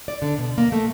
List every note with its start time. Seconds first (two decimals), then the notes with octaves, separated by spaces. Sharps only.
0.08 D5
0.22 D3
0.38 B2
0.58 A#3
0.72 A3